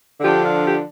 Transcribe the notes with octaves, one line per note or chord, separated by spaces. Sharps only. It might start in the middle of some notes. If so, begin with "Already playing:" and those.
D3 F3 D4 G4
F4
G4